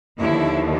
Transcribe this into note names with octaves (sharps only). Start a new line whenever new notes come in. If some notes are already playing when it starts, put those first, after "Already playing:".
D#2 D3 F3 E4